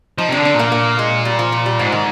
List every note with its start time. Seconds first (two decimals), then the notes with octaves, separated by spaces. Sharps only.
0.18 F3 D#4
0.29 C3
0.32 D4
0.37 D3
0.45 D4
0.54 A#2
0.59 A#3
0.72 A#3
0.99 G#3
1.25 G3
1.39 F3
1.52 F3
1.66 G3
1.79 G#2 F3
1.92 D#3